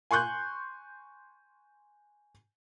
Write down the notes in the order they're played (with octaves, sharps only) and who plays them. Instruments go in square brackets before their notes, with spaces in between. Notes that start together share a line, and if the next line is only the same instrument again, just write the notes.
[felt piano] G#5 C6 C#6 F#6 G6